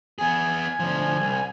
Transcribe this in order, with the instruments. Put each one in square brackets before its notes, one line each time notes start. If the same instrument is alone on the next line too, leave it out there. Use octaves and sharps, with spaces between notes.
[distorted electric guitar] B3 G#4 [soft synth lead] G#5
[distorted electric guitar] D2 F3
C2